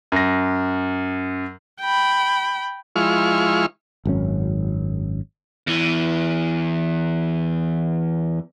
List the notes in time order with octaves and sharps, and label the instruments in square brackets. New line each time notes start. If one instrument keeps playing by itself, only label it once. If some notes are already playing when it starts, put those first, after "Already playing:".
[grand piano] F#2 A#6
[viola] G5 B5
[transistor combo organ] F3 G#3 E4 C#6 F6
[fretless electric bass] G#1 F#2 C#4
[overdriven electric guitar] E2 E3